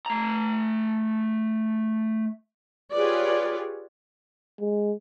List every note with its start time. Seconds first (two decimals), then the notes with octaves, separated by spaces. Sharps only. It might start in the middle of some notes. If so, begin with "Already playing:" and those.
0.06 A3 A#5
2.93 F4 G4 G#4 B4 C#5 D5
4.60 G#3